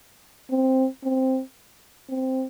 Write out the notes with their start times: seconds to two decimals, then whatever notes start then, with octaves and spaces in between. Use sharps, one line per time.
0.50 C4
1.04 C4
2.09 C4